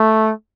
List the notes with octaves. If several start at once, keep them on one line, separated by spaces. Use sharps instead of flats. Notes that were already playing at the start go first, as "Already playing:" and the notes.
Already playing: A3